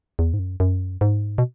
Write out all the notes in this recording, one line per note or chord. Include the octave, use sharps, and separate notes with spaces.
E2
G#2
F#2
F#2
G#2
B2